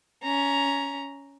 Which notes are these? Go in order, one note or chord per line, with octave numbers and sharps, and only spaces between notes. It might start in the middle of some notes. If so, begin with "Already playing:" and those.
C#4 A#5